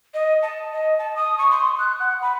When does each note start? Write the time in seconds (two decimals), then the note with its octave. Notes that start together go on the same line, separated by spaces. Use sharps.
0.14 D#5
0.42 A5
0.72 D#5
0.99 A5
1.16 D#6
1.38 C#6
1.51 C6
1.79 F#6
2.00 F#5
2.22 B5